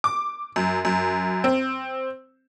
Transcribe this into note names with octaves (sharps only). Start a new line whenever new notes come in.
D6
F#2
F#2
C4